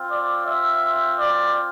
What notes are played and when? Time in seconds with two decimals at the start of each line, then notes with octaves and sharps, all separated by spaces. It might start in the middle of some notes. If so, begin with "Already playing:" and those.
Already playing: C4 F4
0.11 D5
0.47 E5
1.19 D5